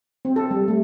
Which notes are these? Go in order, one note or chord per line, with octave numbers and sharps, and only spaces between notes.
C4
A4
G3
A3